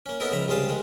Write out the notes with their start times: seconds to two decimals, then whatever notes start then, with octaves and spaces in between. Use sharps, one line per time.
0.06 A#3 C#4
0.20 B3 C#4 D#4 E4 A4 A#4
0.32 C#2 F3 E5 A#5 B5
0.48 C#2 C3 G3 G#4 F5 A5
0.69 D#3 G#3